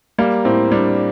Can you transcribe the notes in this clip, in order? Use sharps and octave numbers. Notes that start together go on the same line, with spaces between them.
G3 A#3
A2 C4
G3 D4